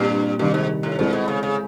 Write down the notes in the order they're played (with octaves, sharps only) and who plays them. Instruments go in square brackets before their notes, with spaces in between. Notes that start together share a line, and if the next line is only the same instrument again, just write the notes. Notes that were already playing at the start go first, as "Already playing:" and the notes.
Already playing: [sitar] G2 [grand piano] A#2 G3 C4
[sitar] G2 [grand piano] C3 D#3 G3
[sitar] G#2
A2
[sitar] A#2 [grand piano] G#3 C4 E4 A4 C5
[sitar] B2
C#3
C#3